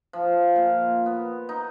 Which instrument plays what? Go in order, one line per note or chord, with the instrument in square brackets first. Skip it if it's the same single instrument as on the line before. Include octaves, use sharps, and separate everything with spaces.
[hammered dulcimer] F3
A#2
B3
D#4